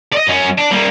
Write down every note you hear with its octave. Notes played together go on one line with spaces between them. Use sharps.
D5 D#5
F#2 C#4
D4
G3 A#3